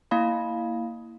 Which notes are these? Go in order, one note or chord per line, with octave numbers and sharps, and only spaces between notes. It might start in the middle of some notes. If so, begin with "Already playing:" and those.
A#3 E4 F5 B5